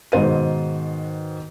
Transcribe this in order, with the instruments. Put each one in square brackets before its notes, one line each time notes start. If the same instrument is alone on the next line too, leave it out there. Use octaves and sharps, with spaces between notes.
[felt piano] G#2 B2 D#3 C5 D#7